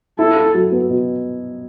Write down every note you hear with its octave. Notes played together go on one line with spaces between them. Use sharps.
E4 A4
E4
F#3
B3
B2